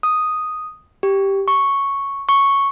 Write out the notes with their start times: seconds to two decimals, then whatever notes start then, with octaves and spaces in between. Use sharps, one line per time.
0.03 D#6
1.03 G4
1.48 C#6
2.29 C#6